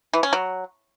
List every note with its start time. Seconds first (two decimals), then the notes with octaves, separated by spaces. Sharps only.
0.14 E3
0.23 C#4
0.33 F#3